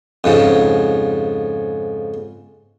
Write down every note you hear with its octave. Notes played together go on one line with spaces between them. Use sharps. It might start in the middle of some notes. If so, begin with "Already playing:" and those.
F2 G#2 C#3